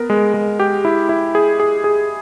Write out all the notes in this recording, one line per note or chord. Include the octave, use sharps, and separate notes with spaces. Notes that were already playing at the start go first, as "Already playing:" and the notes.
Already playing: B3 A#4
G#3
G#3
G4
E4
E4
G#4
G#4
G#4